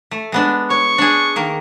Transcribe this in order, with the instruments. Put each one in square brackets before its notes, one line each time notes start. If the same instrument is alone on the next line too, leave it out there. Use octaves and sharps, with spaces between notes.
[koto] A3
G#3 B3 D4
[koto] C#5 [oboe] C#6
[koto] D4 G#4
D#3 A#3